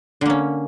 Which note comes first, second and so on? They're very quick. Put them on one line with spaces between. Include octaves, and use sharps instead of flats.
D3 A#3 C#4